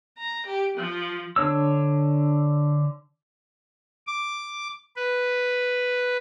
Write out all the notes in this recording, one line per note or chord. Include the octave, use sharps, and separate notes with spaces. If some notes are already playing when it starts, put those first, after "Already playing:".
A#5
G4
F3
D3 D4 C#5 E6
D6
B4